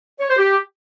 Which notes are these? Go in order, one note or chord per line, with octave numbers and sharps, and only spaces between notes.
C#5
C5
G4